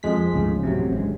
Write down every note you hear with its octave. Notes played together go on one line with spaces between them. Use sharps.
F2 G#3 B6
D2 G#2 C#3
D1 A1 C3 F#3
G#1 D2 G#3